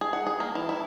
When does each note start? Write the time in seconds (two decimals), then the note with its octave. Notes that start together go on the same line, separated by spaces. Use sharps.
0.01 G#4
0.13 F#5
0.27 G#4
0.40 A#3
0.55 E3
0.69 E4